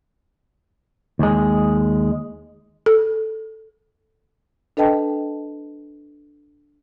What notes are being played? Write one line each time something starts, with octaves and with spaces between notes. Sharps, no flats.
D#2 G#3
A4
D4 A4 B4 D#5 G5 A5